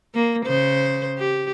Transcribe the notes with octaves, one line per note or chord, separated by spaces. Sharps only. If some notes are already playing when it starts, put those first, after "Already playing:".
A#3
C#3 C5
G4